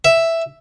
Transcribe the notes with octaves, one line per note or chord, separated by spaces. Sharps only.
E5